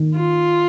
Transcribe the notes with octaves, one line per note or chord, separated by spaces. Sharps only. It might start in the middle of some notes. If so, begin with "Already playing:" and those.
Already playing: D#3
F4